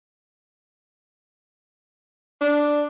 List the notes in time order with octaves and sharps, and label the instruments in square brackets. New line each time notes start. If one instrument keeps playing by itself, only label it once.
[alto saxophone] D4